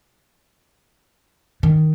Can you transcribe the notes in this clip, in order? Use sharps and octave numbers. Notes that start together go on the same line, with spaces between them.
D#3